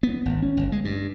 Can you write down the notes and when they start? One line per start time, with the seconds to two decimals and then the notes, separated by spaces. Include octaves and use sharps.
0.03 B3
0.26 G#1
0.42 C#4
0.57 G1
0.72 G#3
0.85 G2